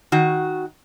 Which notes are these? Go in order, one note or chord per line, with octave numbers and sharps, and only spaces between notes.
D#3 F#4